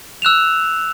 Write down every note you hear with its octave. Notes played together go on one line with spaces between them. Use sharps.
E6 F#6 E7 F7